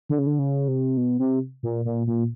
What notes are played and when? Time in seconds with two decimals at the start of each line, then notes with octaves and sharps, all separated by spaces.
0.09 D3
0.19 C#3
0.27 D3
0.39 C#3
0.68 C3
0.97 B2
1.19 C3
1.63 A#2
1.85 A#2
2.07 A#2